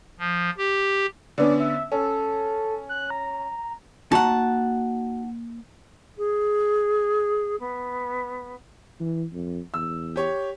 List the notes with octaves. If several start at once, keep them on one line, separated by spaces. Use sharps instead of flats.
F3
G4
D3 B3 C#4 D5
E5
C#4 A4
F#6
A#5
A#3 D#4 F#4 F#5 A5 A#5
G#4
B3
E3
F2
E2 E6
G4 C#5